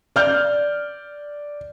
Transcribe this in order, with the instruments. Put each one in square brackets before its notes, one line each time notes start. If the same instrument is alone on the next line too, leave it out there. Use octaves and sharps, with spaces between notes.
[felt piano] D5 F6 G6